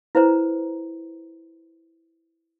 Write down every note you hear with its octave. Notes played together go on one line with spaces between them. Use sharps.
E4 B4 C5 A#5